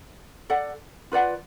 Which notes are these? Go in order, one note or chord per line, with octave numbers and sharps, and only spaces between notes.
A4 D5 F#5
F4 B4 D5 F#5